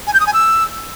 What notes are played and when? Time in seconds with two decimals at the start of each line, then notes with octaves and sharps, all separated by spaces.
0.07 G#5
0.14 G6
0.20 D#6
0.27 G#5
0.33 E6